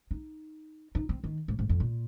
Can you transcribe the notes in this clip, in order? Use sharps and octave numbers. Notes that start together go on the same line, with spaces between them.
D#4
D#4
C4
D#3
G#2
G#2
F2
A#2